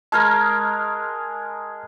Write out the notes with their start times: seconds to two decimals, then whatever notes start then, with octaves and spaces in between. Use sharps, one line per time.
0.12 G#3 G#4 A#4 A5 F6 G#6